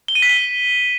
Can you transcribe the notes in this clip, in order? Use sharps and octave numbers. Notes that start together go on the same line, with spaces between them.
G7
D#7
B6
G7